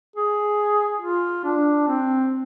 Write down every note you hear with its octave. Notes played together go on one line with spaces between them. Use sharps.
G#4
F4
D4
C4